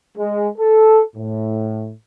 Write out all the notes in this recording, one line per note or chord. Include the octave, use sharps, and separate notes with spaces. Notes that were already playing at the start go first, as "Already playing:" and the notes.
G#3
A4
A2